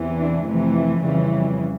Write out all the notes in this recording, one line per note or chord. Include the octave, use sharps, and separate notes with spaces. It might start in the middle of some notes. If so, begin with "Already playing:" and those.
Already playing: E2 C3 E3
D4
F2 C3 E3 A3
F2 C#3 E3 G3